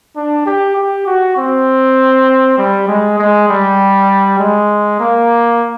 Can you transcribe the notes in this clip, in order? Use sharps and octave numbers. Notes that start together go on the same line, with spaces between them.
D4
G4
G4
F#4
C4
G3
G#3
G#3
G3
G#3
A#3